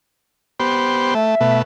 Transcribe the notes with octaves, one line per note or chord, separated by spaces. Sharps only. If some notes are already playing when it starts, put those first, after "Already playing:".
B3 G4 C5
A3 E5
B2 A3